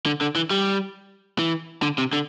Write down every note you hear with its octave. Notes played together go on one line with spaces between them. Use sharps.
D3
D3
E3
G3
E3
D3
C3
D3